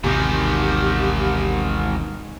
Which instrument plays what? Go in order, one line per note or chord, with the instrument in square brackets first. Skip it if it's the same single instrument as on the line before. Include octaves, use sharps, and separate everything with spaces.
[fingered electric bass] A1 D#2 C3 [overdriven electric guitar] G#2 D#3 [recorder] G4